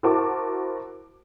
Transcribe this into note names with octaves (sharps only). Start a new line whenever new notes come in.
E4 F#4 A#4 C5 A5 D6